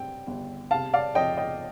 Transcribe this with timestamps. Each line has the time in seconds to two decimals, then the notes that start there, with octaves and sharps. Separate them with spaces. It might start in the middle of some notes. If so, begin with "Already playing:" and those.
Already playing: G2 C4 G5
0.27 G1
0.71 C3 F5 A5
0.94 D5 F5
1.15 F2 D#5 G5
1.37 D#5 G5